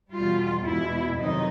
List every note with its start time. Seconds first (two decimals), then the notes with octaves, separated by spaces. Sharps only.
0.14 E2 B2 G3 F4
0.66 E2 B2 G#3 E4
1.17 F2 C3 D#3 F#3 D#4